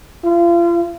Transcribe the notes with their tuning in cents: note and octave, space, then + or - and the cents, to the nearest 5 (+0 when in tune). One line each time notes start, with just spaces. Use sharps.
F4 -35